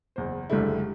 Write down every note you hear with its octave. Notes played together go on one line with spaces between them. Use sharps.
F#1 E2 C5
F#1 C#2 D3 G3 A3 E4